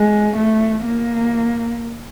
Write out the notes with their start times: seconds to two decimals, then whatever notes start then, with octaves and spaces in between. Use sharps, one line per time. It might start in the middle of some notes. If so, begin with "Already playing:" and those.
Already playing: G#3
0.37 A3
0.85 A#3